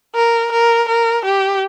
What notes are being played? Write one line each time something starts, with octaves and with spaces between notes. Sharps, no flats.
A#4
A#4
A#4
G4